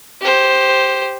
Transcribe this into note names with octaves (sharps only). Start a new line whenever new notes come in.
G4 C5